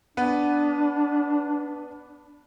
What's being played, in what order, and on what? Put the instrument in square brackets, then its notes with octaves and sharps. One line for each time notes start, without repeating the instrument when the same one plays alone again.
[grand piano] B3 B4 [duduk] D4